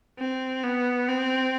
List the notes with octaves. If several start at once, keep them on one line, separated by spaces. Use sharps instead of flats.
C4
B3
C4